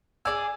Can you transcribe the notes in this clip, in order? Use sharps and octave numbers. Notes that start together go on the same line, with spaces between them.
G#4 D5 G#5 E6